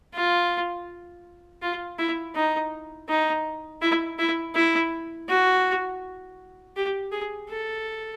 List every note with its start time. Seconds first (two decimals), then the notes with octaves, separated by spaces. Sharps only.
0.15 F4
1.62 F4
1.99 E4
2.35 D#4
3.09 D#4
3.82 E4
4.19 E4
4.55 E4
5.29 F#4
6.76 G4
7.12 G#4
7.50 A4